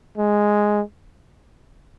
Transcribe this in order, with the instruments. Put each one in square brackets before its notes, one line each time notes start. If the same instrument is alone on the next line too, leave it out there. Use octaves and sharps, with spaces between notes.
[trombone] G#3